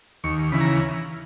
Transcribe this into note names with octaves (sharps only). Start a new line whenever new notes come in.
D#2 C#6
C#3 E3 B5
A#5